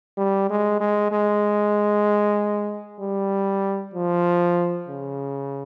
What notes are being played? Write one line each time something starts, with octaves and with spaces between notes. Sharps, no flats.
G3
G#3
G#3
G#3
G3
F3
C#3